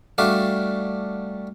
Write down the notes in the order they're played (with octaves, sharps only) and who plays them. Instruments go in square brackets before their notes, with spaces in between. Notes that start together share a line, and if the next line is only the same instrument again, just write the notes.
[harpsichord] G3 A3 D4 F#4 D5 F5